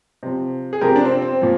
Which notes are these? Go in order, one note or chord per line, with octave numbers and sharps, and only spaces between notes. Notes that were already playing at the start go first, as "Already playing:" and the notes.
C3 F3
G#4
C3 F3 G4 A#4
D4
C4
C4
A#2 F3